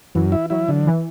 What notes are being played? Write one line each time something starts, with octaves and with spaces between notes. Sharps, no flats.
F#2 E3
E4
F#3 E4
D3
E3